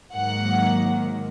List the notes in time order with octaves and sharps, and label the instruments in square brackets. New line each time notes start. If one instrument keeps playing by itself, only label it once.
[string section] G#2 D#3 F#3 A#3 F#5